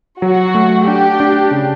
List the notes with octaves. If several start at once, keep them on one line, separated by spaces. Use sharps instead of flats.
F#3 F#4
A3
D4 G4
D4
C#3